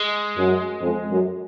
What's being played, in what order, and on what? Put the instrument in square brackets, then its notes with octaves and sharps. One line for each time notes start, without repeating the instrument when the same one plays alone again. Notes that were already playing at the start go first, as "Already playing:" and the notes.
Already playing: [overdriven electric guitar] G#3
[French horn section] F#2
F2
F#2